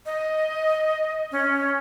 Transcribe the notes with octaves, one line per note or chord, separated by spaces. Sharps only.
D#5
C#4